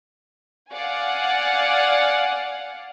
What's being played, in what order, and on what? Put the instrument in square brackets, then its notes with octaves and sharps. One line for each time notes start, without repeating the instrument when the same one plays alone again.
[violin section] D5 F5 F#5 G#5